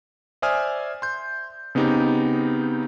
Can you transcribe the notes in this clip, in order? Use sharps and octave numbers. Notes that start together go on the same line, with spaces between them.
C5 D5 E5 G#5 D#6 F6
C6 G6
C#3 B3 C4 D#4 G4